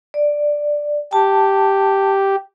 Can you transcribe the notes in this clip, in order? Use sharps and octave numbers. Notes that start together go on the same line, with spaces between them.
D5
G4 A5